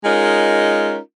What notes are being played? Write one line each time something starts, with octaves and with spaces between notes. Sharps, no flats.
G#3 C#4 D#4 F4 A#4